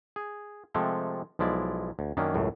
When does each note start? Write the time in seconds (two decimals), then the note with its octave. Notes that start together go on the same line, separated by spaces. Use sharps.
0.16 G#4
0.74 C3 F3 G#3 A3 G4 A4
1.39 B1 F3 G#3 E4 D5
1.99 D2
2.17 F#2 D#3 A#3 C#4 D4
2.34 C#2 F#2 A2